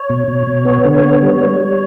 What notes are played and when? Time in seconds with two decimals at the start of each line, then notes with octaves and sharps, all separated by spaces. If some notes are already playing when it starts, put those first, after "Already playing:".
Already playing: C#5
0.10 B2
0.28 B2
0.47 B2
0.65 B3
0.85 D3
1.04 B3
1.22 G3
1.41 G3
1.60 G3